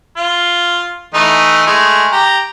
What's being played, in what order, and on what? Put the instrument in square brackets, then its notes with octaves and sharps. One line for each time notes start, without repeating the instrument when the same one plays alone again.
[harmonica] F4
E3 A3 D#4
G#3 A3
G4 A#5